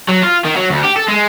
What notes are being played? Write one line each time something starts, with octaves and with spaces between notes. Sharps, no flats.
F#3
F4
D#3
F#3
D2
G4
A4
G#3